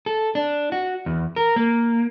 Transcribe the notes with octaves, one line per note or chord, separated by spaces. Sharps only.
A4
D4
F#4
E2
A#4
A#3